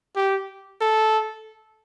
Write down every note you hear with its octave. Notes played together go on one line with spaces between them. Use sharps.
G4
A4